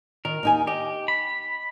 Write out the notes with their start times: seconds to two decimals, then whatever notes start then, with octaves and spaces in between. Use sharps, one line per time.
0.25 D#3 A#4
0.43 D#2 D#4 G#5
0.67 G4 D#5
1.08 B5